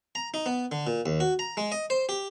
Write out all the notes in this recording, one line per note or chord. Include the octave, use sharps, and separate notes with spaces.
A#5
D#4
B3
D3
A#2
D#2
F#4
A#5
G#3
D#5
C5
G4